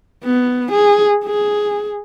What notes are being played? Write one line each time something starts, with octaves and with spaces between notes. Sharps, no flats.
B3
G#4
G#4